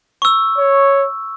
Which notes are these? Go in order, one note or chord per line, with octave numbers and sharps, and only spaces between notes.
C#6 E6
C#5